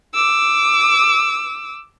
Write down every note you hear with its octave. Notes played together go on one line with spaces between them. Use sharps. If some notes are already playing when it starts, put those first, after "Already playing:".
D6 E6